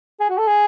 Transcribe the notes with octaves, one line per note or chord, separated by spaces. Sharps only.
G#4
F#4
A4
G#4